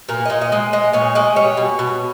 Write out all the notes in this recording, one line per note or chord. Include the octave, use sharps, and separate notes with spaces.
A#2 A#4
A#2 D#5
D#5
G#3
G#3 D#5
A#2 C#5
G#3 D#5
G3 C#5
B2
B2